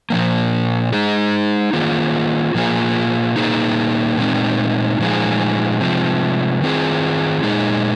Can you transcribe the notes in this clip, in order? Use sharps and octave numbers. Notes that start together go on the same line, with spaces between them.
A#2 F3 A#3
G#3 D#4 G#4
D#3 A#3 F4 G#4
A#2 F3 A#3 F4 G#4
A#2 A#3 D#4 G#4
A#2 G#3 C4 D#4
A#2 F3 G#3 D#4 G#4
C3 F3 G#3
D#3 C4 F4 G#4
A#2 G#3 D#4 G#4